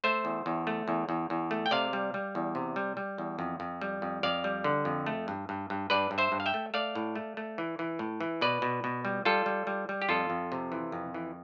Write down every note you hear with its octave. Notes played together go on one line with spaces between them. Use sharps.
A3 C5 E5
E2
E2
A3
E2
E2
E2
A3
G5
C3 D5 F5
G3
G3
E2
C3
G3
G3
E2
F2
F2
G3
F2
F2 D5 F5
G3
D3
F2
A3
G2
G2
G2
G2 B4 D5
G2
C5 E5
G2
F5
E5 G5
A3
A3 D5 F5
A2
A3
A3
E3
E3
A2
E3
B2 B4 D5
B2
B2
G3
G3 F4 A4
G3
G3
G3
G4
F2 F4 A4
F2
C3
E3
F2
E3